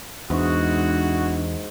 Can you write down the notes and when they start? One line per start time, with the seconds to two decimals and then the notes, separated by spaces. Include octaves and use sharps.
0.30 E2 G#2 D4 E4 F#4 C#6